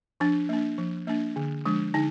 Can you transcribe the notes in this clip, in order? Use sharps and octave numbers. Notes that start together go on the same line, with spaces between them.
F3 D4
A#3 D4
F3
A#3 D4
D3
F3 G#3 D4
D3 D#4